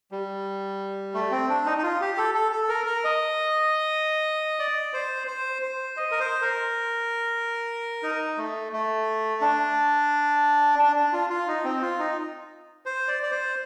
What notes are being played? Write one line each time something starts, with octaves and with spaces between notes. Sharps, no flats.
G3
A3
C4
D4
D#4
D#4
F4
G4
A4
A4
A4
A#4
A#4
D#5
D5
C5
C5
C5
D#5
A#4
C5
A#4
D#4
A3
A3
D4
D4
D4
F4
F4
D#4
C4
F4
D#4
C5
D5
D5
C5